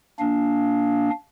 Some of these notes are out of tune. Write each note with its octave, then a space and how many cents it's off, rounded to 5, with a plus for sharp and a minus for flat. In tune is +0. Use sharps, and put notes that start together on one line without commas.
A#3 +0 D4 -15 F5 +0